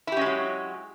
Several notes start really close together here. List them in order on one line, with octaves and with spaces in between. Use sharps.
E4 G4 C#4 G#3 F#3